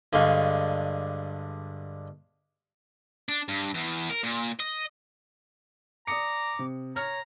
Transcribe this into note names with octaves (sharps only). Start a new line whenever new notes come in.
G2 D3 G#3 F5 C#6
D4
G2
E2
A#4
A#2
D#5
D5 A#5 D6 D#6 C#7
C3
C#5 A#5 F6